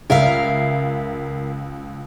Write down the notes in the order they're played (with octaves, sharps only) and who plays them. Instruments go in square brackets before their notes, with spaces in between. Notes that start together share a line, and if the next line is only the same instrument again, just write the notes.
[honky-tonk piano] C#2 [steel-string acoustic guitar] A#4 E5 F5